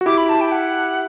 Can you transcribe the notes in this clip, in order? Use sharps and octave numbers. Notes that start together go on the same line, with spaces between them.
F#4
E4 G4 D6
B5
A5
G5
F#5